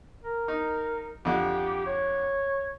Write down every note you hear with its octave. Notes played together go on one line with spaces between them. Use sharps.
A#4
D#4
F2 D3 G4
C#5